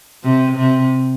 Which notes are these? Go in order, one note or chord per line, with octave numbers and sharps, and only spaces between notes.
C3
C3